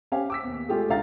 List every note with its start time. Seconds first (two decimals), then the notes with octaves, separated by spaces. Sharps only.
0.12 C#4 G4 C5 F5 G#5
0.30 D6 E6 B6
0.44 D#2 B3
0.69 G#3 A3 F4 G4 G#4
0.89 C#2 D4 E4 F5 A#5 A6